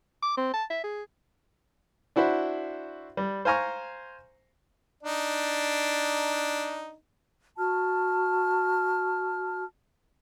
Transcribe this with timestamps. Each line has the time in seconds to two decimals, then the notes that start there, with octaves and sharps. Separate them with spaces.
0.23 D6
0.38 C4
0.54 A5
0.71 E5
0.84 G#4
2.16 D4 E4 F#4 C5 E5
3.17 G3
3.45 C5 F5 G#5 A#5 C#6
5.03 D4 D#4
7.57 F#4 A5 F6